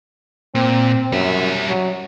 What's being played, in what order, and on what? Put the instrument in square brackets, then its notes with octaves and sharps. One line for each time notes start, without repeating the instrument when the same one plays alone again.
[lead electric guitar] A#2 [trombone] C4
[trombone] F#2 [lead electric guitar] G3 E5
[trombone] F#3